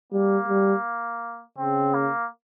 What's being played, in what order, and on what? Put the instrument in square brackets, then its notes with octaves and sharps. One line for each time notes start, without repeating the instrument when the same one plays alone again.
[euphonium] G3 [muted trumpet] A#3
[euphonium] G3
[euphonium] C#3 [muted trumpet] C4
[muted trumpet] A#3